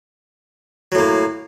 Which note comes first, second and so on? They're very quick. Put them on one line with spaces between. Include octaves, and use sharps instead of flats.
F#3 A2 A#3